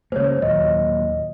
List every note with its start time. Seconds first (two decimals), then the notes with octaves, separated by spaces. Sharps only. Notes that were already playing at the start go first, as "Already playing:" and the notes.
0.12 C#3 G#3 A#3 C5 C#5
0.42 D#2 A#2 F#3 D#5